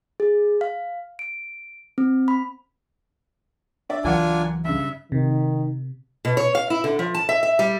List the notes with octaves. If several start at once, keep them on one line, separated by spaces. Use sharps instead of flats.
G#4
F5
D7
C4
B5
D4 D5 E5
C#2 E3 F#3 D4 F4 A#4 F#5 G#5
G2 C#3 E5
C3 D#3
B2
C#5
F5
E4
D3
F3
A5
E5
E5
G3